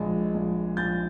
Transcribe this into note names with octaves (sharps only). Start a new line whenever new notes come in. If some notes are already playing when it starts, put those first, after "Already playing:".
Already playing: A#1 G#3
A#1
A#1 G6 A6